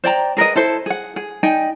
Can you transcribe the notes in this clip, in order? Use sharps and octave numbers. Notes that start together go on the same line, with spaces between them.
C5 D5 G5 A#5
G#4 A#4 B4 D#5
E4 A4 C5
G#4 F#5
G#4
D#4 D5 G5 G#5